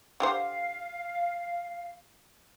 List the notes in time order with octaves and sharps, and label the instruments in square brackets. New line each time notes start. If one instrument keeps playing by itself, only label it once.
[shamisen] D3 G4 C5 [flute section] F5